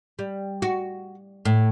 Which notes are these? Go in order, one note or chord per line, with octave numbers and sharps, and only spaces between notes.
G3
F#4
A2